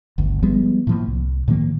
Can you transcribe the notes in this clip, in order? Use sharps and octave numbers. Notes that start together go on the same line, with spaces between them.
G1 D2
F3 G3 G#3 B3
A2 F3 A#3
C2
A2 D#3 F3 A#3